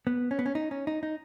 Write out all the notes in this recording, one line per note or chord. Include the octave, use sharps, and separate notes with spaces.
B3
C#4
B3
C#4
D#4
C#4
D#4
D#4